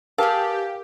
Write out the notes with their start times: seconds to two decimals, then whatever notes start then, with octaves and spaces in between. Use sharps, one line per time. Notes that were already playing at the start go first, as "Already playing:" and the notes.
0.18 G4 G#4 A#4 B4 F5 A5